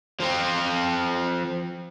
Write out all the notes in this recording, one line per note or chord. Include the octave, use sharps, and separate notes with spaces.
F3 C4